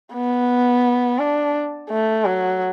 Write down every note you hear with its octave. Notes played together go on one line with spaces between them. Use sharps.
B3
D4
A3
F#3